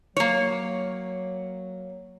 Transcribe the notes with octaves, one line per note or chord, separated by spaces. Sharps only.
F#3 A#3 C#5